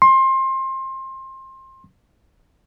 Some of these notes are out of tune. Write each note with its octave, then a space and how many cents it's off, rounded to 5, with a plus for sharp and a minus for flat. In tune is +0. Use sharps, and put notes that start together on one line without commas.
C6 +25